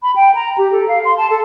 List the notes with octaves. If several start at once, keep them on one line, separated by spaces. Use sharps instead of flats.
B5
G5
A#5
G4
A4
F5
C6
A5
A4